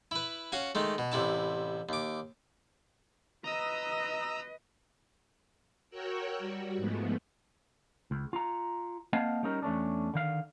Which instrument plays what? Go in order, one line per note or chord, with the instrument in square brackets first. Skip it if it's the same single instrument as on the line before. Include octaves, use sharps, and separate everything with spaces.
[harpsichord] E4 B4
C#4 F#4 F5 G#5
D#3 G#3 A3
B2
A1 C3 E4 A5
D#2 D6
[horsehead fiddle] B4 D#5 [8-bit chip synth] A#5 D#6 E6
[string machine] F#4 A#4 C#5 G5 E6 F#6
G3 F#4
G#2 F3 G#3 A3 B3
[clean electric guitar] C#2
F4 A#5
A#3 C4 D#5 F5 F#5 A5
G3 C#4 D#4 A#4
E2 A3 C#4 D4
D3 D#3 F5